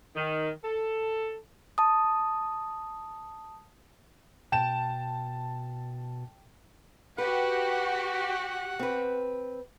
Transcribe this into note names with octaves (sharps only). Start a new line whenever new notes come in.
D#3
A4
A5 D#6
B2 G5 A5 E7
F#4 G4 B4 F#5
C4 B4